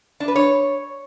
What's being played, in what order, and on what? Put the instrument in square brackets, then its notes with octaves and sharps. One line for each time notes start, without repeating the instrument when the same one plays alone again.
[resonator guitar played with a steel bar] D4
B4
C#5